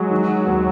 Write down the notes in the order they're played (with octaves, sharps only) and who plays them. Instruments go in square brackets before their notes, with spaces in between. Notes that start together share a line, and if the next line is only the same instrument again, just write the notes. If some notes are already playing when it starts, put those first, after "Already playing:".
Already playing: [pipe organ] F#3 [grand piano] G#3
[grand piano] D#3
D#2